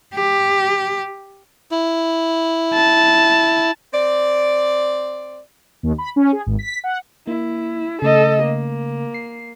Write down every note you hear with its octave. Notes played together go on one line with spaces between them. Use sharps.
G4
E4
A5
C4 D5
D#2
B5
C#4
G#4
G#1
B6
F#5
A#3 E4
C#3 A3 A4 D#5
A#3
C7